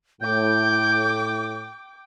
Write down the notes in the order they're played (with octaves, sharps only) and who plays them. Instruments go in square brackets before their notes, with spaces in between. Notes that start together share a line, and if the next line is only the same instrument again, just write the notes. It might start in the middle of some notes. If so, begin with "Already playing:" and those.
[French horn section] A2 [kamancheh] G5 D6 [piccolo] G6